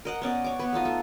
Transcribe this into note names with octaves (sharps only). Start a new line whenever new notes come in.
A#4 D#5 F#5
B3 C#4 D5 D#5
C#5 D6
B3 B4
A3 D#4 F4 D#5
A3